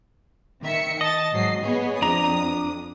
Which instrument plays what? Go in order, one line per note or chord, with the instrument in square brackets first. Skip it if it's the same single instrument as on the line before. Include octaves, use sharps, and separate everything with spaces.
[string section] D#3 E5 C#7
[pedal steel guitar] D#5 [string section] A5 A6
[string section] G#2 F#3 C7
B3 G#4 C#5
[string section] F2 D#6 [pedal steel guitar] D4 A#5